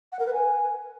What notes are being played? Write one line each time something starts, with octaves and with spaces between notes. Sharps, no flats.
F#5
A#4
B4
G#5